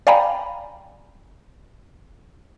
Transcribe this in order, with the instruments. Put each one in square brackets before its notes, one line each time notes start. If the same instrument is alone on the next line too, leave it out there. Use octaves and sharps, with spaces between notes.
[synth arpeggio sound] D5 F5 G5 G#5 A#5 B5